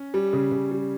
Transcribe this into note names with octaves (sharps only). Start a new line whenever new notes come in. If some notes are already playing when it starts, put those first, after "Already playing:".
Already playing: C#4
G3
C#3
C#3
G3